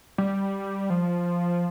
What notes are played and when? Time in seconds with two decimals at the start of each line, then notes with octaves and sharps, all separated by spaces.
0.18 G3
0.90 F3